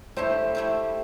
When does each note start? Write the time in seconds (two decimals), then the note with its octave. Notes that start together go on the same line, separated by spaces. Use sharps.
0.16 A3 E4 G4 C5
0.55 A3 E4 G4